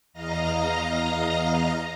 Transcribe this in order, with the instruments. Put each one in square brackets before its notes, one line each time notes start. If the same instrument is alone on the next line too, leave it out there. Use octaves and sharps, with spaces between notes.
[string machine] E2 D#5 F5 A#5 A#6